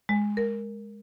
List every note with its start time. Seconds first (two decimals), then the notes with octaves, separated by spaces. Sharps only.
0.09 G#3
0.37 A#4